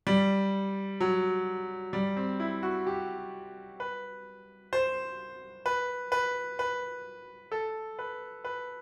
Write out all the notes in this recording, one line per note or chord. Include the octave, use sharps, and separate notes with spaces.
G3
F#3
G3
C4
E4
F#4
G4
B4
C5
B4
B4
B4
A4
B4
B4